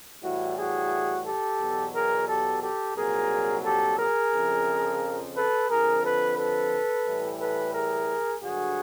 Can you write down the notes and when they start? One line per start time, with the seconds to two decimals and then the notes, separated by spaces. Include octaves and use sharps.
0.23 A2 E3 G3 E4 F#4
0.58 F#4 G#4
1.26 G4 A4
1.60 E2 B2 F#3
1.94 G#4 A#4
2.28 G4 A4
2.63 G4 A4
2.97 C2 A#2 F#3 G#4 A#4
3.65 G4 A4
3.99 G#4 A#4
4.34 F2 C#3 F3
5.36 A4 B4
5.70 F2 D3 F3 G#4 A#4
6.04 A4 B4
6.38 A4 B4
7.06 A2 E3 G3
7.40 A4 B4
7.75 G#4 A#4
8.42 G2 D3 F#3 F#4 G#4